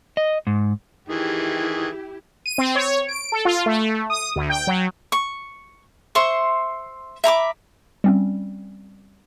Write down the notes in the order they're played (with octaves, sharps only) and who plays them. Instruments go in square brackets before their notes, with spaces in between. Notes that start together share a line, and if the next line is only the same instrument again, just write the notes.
[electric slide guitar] D#5
G#2
[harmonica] D#3 E3 G#4 [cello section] E4 G4
[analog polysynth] D#7
C4
C#5
D7
A4
F4
A3
D#6
D2
G5
F#3
[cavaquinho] C#6
C5 E5 C6 C#6
E5 A#5 B5 D6
[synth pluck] G3 C4 C#4